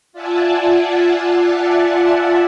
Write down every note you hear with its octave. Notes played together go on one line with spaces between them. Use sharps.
F4 D5 E5 F#5 G#5 A5